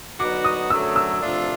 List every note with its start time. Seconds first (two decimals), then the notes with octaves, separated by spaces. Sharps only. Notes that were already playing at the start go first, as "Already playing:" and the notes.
0.20 D3 F#3 B3 D#4 F#4 D6
0.44 D#6
0.70 F#2 D3 F#3 A3 E6
0.96 E6
1.20 C3 F3 A3 D4 F4